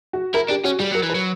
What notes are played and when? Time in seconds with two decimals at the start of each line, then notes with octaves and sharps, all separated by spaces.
0.13 F#4
0.34 E4 A#4
0.49 D4 G4
0.64 C#4 F#4
0.79 G3 G4
0.91 F#3 A#4
1.03 E3
1.10 B4
1.15 F#3